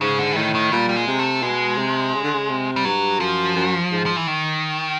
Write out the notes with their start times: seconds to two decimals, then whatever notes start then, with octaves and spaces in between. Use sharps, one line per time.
0.01 G#2 C#3
0.19 D3
0.32 E3
0.36 A2 D#3
0.55 D#3
0.72 A#2 G3
0.89 G3
0.96 G#3
1.07 C3
1.19 A3
1.42 B2 G#3
1.78 C3
2.14 C#3
2.23 D3
2.34 C#3
2.50 C3
2.76 G3
2.85 G2 F#3
3.20 F#2 F3
3.56 F#2
3.92 G#2
4.06 F3
4.16 E3
4.27 D#3